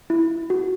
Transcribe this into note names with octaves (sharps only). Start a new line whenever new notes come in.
E4
F#4